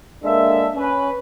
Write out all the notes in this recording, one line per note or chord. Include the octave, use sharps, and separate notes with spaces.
G#3 A#3 D4 A4 E5
C#4 B4